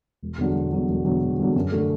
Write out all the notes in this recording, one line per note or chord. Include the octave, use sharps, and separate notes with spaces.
E1
E2 D3 F#3
E1
E2 D3 F#3
E1
E2 D3 F#3
E1
E2 D3 F#3
F#2
D3 A3